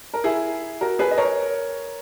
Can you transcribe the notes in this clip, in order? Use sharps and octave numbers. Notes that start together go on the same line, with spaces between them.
A#4
E4 G#4
F#4 A#4
G#4 B4
D#5
A#4 C#5